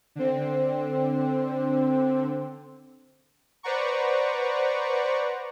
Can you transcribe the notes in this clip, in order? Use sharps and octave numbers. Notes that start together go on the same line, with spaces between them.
D3 C4
B4 C5 D5 F#5 A#5 C#6